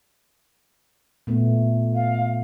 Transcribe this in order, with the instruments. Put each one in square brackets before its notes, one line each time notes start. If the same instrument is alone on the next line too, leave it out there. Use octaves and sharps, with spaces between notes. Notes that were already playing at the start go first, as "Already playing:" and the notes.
[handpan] A#2 A3 B3
[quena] F5